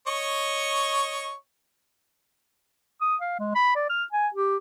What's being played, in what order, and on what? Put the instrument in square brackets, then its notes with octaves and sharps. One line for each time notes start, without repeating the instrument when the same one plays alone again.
[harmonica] C#5 D#5 C#6
[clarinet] D#6
F5
G#3
B5
D5
F6
G#5
G4